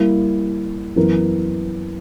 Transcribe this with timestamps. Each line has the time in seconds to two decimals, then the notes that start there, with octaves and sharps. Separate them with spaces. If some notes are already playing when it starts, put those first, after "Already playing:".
Already playing: G3 A#3 E4
0.96 F#2 E3 B3 E4 A#4